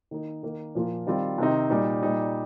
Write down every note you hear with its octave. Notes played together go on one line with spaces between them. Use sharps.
D#3 A#3 D#4
D#3 A#3 D#4
A#2 F3 A#3 F4
D#3 G3 C4 F4
C3 D#3 C4 D#4
A#2 G3 D#4
A#2 G3 D#4